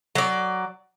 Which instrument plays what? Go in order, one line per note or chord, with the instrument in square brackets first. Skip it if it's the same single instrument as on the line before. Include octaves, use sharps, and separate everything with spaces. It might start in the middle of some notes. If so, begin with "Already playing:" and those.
[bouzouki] F#3 D5